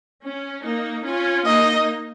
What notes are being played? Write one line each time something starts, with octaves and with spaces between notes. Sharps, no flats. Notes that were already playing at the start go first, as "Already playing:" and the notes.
C#4
A#3 D#4
C#4 F4
A#3 D#4 D#5